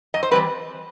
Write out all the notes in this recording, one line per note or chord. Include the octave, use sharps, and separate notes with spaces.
F#2 D#5
C5
E3 G3 C4 B4